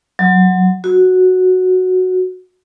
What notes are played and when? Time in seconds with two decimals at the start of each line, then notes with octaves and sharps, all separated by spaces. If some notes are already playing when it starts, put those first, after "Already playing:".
0.19 F#3
0.84 F#4